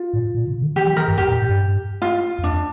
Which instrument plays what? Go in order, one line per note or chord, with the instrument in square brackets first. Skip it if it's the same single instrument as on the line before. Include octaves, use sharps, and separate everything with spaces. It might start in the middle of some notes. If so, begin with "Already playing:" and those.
Already playing: [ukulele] F4
[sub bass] A2
A#2
C3
D3
[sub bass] E3 [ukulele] G4
[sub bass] F3
[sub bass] E3 [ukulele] A#4
[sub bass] G2
[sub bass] F2 [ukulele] G4
[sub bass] A#2
A2
G2
[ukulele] F4
[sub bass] E2
[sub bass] F2 [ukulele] D4